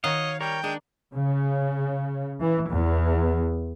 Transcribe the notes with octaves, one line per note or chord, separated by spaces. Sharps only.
D#3 F#4 C#5 D#5 F5
G3 A#4 C#5 G5
G#3 A#3 D4
C#3
E3
E2